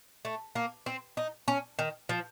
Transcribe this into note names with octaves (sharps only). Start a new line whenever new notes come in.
A3
A#3
C4
D#4
C#4
D#3
F3